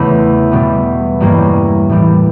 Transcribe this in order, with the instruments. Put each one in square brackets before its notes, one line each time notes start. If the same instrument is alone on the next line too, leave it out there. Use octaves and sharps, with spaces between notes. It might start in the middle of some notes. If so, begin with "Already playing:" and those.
Already playing: [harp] E2 C#3 E3 A3
B2 G3 B3
G2 E3 G3 A#3 C#4
A2 E3 G3